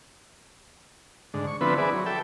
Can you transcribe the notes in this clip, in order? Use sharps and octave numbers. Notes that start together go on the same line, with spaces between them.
G#2 D3
C#6
D3 F3 B3 C4 E4 B4
E4 G#4 B4 D5
F#3
A4 E5 G5